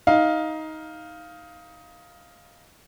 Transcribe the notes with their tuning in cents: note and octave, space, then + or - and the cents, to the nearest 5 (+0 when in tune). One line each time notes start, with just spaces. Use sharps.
D#4 +15 F5 +0